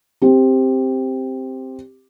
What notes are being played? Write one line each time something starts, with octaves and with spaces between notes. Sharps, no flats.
C4 G4